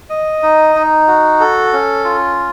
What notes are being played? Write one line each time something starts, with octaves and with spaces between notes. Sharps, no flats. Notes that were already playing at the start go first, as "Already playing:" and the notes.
D#5
D#4
D#4
F#4
A4
C#4
F4